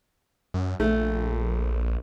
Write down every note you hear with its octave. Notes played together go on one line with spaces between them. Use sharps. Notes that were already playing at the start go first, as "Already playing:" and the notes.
F#2
A#1 A3